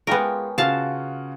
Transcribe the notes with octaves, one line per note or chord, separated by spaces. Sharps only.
G#3 B3 C#4 F4 G4 A#4 G5
C#3 F4 F#4 F5 A5